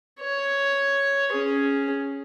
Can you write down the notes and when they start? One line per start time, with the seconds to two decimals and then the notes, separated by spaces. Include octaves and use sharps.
0.20 C#5
1.32 C#4 G#4